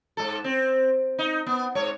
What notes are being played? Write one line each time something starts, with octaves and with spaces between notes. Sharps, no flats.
G#2 A4
C4
D#4
B3
G#2 C#5